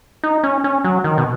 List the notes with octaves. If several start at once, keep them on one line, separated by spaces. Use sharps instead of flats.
D#4
C#4
C#4
F#3
D#3
B2